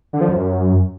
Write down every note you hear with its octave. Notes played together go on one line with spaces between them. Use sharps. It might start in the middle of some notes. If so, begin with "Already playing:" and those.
D3
F3
F#2